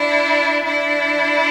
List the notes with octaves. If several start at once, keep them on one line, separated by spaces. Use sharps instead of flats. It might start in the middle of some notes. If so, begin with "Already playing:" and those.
Already playing: D4 E4
D4 E4